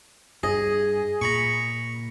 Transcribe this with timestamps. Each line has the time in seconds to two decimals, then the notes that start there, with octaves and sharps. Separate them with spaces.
0.43 G2 G#4 D#5
1.22 A#2 A#5 B5 C#6